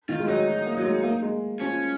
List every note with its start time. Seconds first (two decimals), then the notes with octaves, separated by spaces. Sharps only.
0.09 D#3 F4
0.20 G#3
0.28 F#3 D#4
0.47 F#3
0.66 A#3
0.77 F#3
0.85 G#3
1.04 A#3
1.22 G#3
1.60 F3 C#4